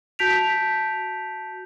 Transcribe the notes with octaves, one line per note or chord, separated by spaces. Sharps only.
F#4 A5 G6 B6 D7 F7